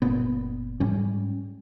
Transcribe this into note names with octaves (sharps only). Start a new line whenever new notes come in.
F#1 A#2 B3
G#2 G3 C#4